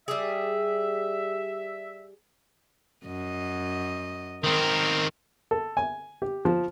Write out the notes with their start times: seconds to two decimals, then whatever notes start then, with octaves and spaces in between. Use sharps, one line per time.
0.08 G3 G4 G#4 E5
3.06 F#2 D#5
4.44 D#3 C4 A#4
5.51 A4
5.77 G#5
6.22 G4
6.45 F3